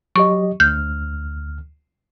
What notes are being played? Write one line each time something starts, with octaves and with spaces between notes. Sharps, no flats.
F#3 G4 D#5 C#6
D2 F6 G6